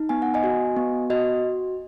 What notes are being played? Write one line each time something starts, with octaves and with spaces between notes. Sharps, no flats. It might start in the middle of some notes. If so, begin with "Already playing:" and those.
Already playing: D#4
B3 G#5
F#5
D#5 G#5
F#4
B3
F#4 D#5